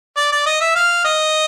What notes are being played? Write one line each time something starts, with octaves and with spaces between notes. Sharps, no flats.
D5
D5
D#5
E5
F5
D#5